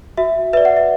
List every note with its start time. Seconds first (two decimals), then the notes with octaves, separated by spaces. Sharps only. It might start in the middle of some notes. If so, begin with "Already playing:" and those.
0.17 F#4 E5
0.53 B4 D5 E5
0.65 F#5
0.77 E5